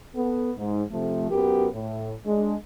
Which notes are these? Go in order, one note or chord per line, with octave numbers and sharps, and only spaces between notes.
B3 A4
G#2
C3 F3 A3
F#2 B3 F#4 G4 A#4
A2
G#3 D4